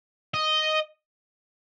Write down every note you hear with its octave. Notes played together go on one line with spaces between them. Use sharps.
D#5